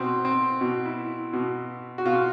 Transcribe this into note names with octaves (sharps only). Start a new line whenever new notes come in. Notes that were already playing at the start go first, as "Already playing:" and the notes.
Already playing: B2 C4
C4
B2
E4
B2
F#4
B2 F4